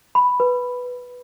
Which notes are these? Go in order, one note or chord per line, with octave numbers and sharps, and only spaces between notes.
B5
B4